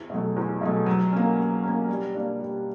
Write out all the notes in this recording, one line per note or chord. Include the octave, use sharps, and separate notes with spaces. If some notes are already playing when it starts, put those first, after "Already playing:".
Already playing: E2
B2 F#3 A3
E2
B2 F#3 A3
F#3
A#3 C#4
F#3
A#3 C#4
G3
A#3 D4
G3